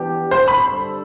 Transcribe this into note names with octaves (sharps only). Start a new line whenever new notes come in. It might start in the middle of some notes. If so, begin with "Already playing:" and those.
Already playing: E3 B3 D4 G4
C5
B5
G2 D3 G3 D4 A4